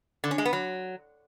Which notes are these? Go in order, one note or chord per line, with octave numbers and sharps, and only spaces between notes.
D3
C#4
G#3
B3
F#3